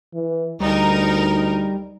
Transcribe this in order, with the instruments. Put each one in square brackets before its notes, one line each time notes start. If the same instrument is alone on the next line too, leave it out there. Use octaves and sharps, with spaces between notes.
[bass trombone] E3
[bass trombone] D2 [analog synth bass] G3 [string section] D#4 A#4